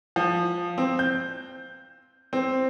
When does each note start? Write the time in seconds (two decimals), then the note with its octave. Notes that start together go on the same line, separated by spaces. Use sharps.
0.16 F3
0.78 C4
0.99 G6
2.33 C4